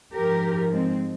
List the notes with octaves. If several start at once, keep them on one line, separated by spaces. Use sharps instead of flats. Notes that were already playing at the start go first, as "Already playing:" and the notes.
G#2 F3 G4 A#4
G#3 C4